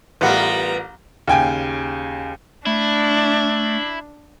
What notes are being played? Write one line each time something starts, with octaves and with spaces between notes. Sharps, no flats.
A1 G3 B3 F4 A#4 F5 F#5 A#5
D#2 C#3 G5 G#5
A3 D4 E4